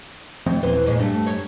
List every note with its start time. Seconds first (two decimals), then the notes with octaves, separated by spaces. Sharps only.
0.46 F2 F3 A3 C4
0.63 D#1 E3 B4 C5
0.86 F2 A#2 G#3
1.00 G2 A3
1.26 F#2 C#5